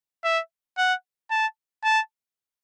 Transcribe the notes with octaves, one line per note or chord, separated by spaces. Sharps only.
E5
F#5
A5
A5